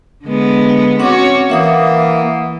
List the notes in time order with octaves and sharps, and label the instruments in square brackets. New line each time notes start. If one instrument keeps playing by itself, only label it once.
[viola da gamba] D3 G#3 B3
[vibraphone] C4 F#5 D6 [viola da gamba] C#4 F#4 C#5
[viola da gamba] E3 [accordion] A#3 [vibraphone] E5 F#5 D#6